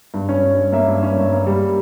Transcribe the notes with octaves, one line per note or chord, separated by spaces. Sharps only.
G2
C#4
G2
C#4
A#3 E5
G2
C#4
G2
A#3
G3